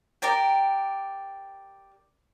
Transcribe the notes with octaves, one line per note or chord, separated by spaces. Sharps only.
G4 A#4 D5 G5